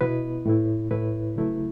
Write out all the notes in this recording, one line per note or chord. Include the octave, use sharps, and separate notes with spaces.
B2 B3 E4 B4
A2 A3 E4
A2 A3 E4 B4
C#3 F#3 A3 E4